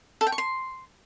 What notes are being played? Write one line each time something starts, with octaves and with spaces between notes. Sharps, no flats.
A4
G5
C#6
C6